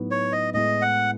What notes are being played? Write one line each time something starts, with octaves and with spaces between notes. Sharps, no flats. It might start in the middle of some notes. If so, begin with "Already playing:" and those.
Already playing: A2 F#3 B3 D#4 F#4
C#5
D#5
A2 G#3 B3 E4 D#5
F#5